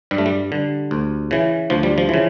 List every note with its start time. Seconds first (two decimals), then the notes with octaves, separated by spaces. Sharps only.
0.11 G2 G3
0.18 A3
0.26 G3
0.52 D3
0.91 D2
1.31 C#3 E3
1.70 D2 F3
1.83 G3
1.98 F3
2.09 C#3 E3